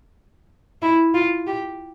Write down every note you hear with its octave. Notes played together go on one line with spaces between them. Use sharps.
E4
F4
G4